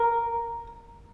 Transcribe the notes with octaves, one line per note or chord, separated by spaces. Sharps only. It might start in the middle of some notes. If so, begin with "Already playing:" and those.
Already playing: A#4